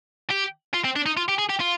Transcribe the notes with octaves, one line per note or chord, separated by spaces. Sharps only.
G4
F4
C4
D4
D#4
F4
G4
G#4
G4
F4